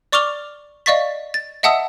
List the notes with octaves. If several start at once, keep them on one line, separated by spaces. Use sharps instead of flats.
D5 C#6 D6 F6 F7 G7
D5 D#5 F5 C#6 A6 B6
A6
D#5 E5 F#5 A5 D#6 E6